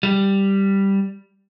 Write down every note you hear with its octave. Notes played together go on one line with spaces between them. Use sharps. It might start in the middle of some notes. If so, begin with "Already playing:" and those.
G3